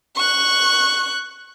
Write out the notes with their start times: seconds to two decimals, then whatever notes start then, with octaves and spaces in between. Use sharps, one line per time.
0.16 C#6 F#6